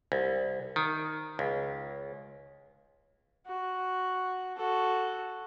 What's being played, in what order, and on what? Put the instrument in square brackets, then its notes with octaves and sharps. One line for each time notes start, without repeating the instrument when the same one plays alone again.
[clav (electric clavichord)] C2
D#3
C#2
[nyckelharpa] F#4
F#4 A4